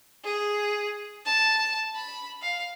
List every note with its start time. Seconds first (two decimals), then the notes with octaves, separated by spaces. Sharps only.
0.24 G#4
1.25 A5
1.95 B5
2.42 F5